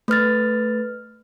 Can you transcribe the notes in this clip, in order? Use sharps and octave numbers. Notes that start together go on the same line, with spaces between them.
A3 B4 F6 A6